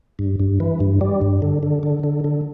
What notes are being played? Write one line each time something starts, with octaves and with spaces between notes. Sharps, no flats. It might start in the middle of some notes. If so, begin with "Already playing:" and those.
G2
G2
E3
G2
G3
G2
D3
D3
D3
D3
D3